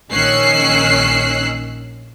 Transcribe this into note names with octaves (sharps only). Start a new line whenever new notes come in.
A#1 D#3 C#4 E6 F#6 C7